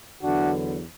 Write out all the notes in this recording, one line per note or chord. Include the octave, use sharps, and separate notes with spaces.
E2 D3 F#3 B3 D4 F#4